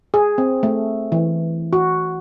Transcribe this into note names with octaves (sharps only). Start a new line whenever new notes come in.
G#4
C4
A3
E3
F#4